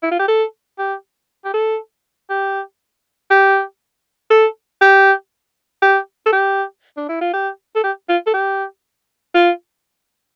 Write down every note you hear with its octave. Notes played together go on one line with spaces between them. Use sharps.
E4
F4
G4
A4
G4
G4
A4
G4
G4
A4
G4
G4
A4
G4
D4
E4
F4
G4
A4
G4
F4
A4
G4
F4